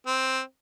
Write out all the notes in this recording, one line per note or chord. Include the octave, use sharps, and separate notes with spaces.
C4